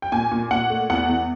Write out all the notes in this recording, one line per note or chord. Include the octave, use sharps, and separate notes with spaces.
G5
A#2 G#5
A#2
A#2 F#5
A3
E2 F#5
E2